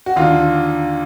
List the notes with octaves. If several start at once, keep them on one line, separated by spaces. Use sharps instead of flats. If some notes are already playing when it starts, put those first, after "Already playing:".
F#4
D#2 D3 F4